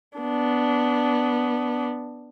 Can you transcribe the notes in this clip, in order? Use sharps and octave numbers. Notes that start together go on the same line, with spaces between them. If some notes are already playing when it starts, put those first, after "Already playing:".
B3 D4